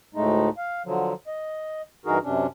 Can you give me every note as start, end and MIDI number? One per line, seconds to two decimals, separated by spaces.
0.15 0.49 38
0.15 0.49 45
0.15 0.49 56
0.15 0.49 57
0.15 0.49 63
0.57 0.82 77
0.85 1.14 50
0.85 1.14 53
0.85 1.14 54
1.27 1.82 75
2.06 2.18 43
2.06 2.18 52
2.06 2.18 63
2.06 2.18 66
2.06 2.18 68
2.06 2.18 70
2.23 2.47 42
2.23 2.47 48
2.23 2.47 61
2.23 2.47 62